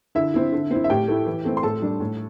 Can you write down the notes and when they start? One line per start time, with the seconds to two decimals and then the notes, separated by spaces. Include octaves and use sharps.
0.15 D3 E4 E5
0.34 C4 E4
0.52 D3
0.71 C4 E4
0.84 E5
0.90 A2 G4 G5
1.08 A3 E4
1.26 E3
1.45 A3 C4 E4
1.57 C6
1.63 A2 A4 A5
1.82 G3 D4
2.00 A2